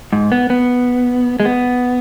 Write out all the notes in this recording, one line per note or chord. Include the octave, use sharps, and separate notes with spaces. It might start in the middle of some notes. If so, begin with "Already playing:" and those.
G#2
B3
B3
G#3
B3